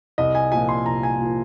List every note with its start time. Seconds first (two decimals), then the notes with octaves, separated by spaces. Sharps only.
0.18 C2 D#5
0.35 G#5
0.52 A#2 F3 G#5
0.69 C6
0.86 C2 A#5
1.03 G#5
1.19 A#2 F3